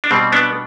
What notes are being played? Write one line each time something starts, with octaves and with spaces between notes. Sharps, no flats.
D4
B2 G3 C4
B3 D4